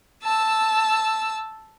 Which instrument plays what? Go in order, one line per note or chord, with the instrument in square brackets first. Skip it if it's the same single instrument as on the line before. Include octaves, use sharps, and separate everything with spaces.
[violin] A5 E6